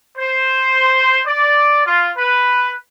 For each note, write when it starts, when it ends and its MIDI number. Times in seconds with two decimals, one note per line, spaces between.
0.18 1.21 72
1.26 1.83 74
1.86 2.09 65
2.17 2.75 71